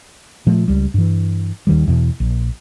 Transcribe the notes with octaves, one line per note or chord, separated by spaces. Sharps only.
A#2 F3 A3
C#2 G3
G2 E3
D#2 D#3 G3
E2 B2
A#1